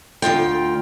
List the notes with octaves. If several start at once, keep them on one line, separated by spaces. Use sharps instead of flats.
D2 G2 F4 G5